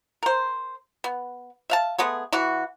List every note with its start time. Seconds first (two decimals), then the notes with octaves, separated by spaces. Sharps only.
0.23 A#4 C5
1.04 B3
1.70 E5 F5 A5
1.98 G#3 A3 B3 G#4
2.33 E3 E4 F#4